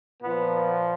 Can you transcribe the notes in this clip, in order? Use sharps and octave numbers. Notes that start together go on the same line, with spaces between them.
A#2 F3 B3